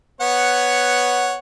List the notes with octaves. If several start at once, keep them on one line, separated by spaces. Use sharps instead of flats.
B3 C#5 F#5